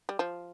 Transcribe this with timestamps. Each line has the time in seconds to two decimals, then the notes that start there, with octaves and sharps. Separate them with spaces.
0.09 G3
0.19 F3